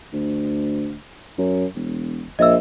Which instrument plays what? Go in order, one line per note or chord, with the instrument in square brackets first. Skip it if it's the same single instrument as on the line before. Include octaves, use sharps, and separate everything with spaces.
[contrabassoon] D2
F#2
E1
[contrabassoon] A#1 [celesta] D#5 E5 E6